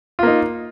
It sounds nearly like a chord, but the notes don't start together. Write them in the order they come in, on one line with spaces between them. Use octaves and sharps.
F4 A#3 D#4